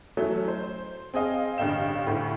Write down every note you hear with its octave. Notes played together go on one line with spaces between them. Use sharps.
E3 F#3 A3 C#4
C5
C4 G#4 D#5 F5
A1 G2 D3 F5 G5 E7
D2 A2